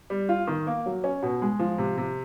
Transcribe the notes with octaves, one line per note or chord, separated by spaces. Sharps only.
G3
F4
D#3
A#3
F#3
C#4
B2
G#3
F3
C3
C3